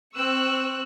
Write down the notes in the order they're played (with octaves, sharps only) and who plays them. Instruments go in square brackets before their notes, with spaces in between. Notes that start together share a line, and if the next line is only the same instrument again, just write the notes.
[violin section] C4 E6 [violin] C#6 F#6